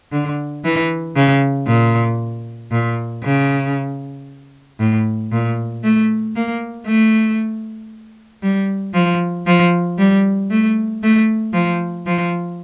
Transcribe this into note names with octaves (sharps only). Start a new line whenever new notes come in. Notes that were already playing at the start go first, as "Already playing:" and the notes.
D3
E3
C#3
A#2
A#2
C#3
A2
A#2
A3
A#3
A3
G3
F3
F3
G3
A3
A3
F3
F3